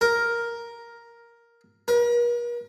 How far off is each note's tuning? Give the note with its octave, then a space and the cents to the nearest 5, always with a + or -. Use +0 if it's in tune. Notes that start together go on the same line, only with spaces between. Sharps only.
A#4 +5
A#4 +45